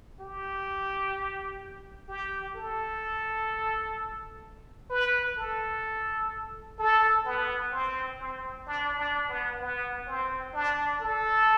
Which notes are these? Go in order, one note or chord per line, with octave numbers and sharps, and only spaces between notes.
G4
G4
A4
B4
A4
A4
B3
C4
C4
D4
D4
B3
B3
C4
D4
A4